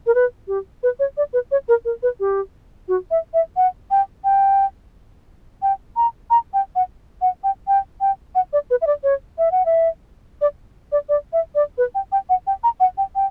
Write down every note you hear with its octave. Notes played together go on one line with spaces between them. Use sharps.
A#4
B4
G4
B4
C#5
D5
B4
C#5
A#4
A#4
B4
G4
F#4
E5
E5
F#5
G5
G5
G5
A#5
A#5
G5
F#5
F#5
G5
G5
G5
F#5
D5
B4
E5
D5
C#5
E5
F#5
E5
D5
D5
D5
E5
D5
B4
G5
G5
F#5
G5
A#5
F#5
G5
G5